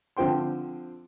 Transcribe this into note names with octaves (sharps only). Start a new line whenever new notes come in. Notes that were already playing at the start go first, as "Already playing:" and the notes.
D3 F3 C4 G5 C6